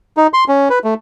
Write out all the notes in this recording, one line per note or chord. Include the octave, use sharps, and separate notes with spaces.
D#4
C6
C#4
B4
A3